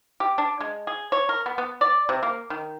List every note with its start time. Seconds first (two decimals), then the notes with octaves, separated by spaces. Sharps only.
0.20 G4
0.38 D4
0.60 G#3
0.87 G#4
1.12 C#5
1.29 A#4
1.46 B3
1.58 B3
1.81 D5
2.09 C3
2.23 A#3
2.50 D#3